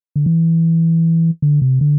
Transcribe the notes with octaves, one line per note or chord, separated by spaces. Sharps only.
D3
E3
D3
C3
D3